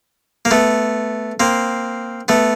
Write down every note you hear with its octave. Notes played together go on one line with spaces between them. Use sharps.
A#3
A3 B3
A#3 C4
A3 B3